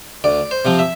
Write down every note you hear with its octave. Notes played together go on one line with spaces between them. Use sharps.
D2 D5
C5
C3 F3 C4
E5